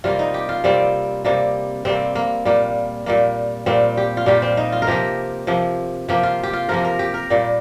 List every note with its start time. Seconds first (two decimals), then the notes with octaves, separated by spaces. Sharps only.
0.04 C3 G3 A#3 F4
0.19 D#4
0.34 G4
0.49 F4
0.64 C3 G3 A#3 C4
1.25 C3 G3 A#3
1.85 C3 G3 A#3 C4
2.15 A#3
2.45 A#2 G3 A#3
3.06 A#2 G3 A#3
3.66 A#2 G3 A#3 C4
3.97 G4
4.17 F4
4.26 A#2 G3 A#3 G4
4.42 C4
4.57 D#4
4.72 F4
4.82 A#4
4.87 C3 F3 A#3 G4
5.47 C3 F3 A#3
6.08 C3 F3 A#3 G4
6.23 F4
6.43 G4
6.53 F4
6.69 C3 F3 A#3 A#4
6.85 A#4
6.99 G4
7.14 A#4
7.30 A#2 G3 A#3